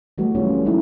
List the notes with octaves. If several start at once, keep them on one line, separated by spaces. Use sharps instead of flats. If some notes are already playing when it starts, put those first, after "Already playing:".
E3 G3 A3 F#4 B4
F#3 C4 C#4 F4 C#5
A4
F#3 G#3 A#3 C#4 D#4 E4